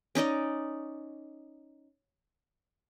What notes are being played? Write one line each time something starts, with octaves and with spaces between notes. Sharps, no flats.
C#4 D#4 D5 D#5